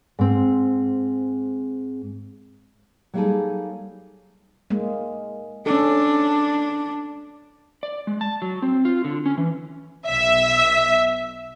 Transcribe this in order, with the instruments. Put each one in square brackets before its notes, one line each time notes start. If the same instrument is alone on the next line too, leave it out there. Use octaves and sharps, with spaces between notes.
[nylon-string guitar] G#2 C4
F#3 G3 A#3 D#4 G#4 A4
[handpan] G#3 A#3
[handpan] C#4 A4 [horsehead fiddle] D4
[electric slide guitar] D5
G#3
A5
F#3
C4
F4
D3
C#4
E3
[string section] B1 E5